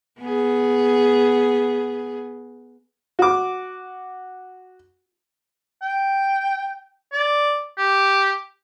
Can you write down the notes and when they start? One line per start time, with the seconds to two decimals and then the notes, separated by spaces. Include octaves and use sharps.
0.21 B3 G#4
3.19 F#4 D6
5.82 G5
7.13 D5
7.78 G4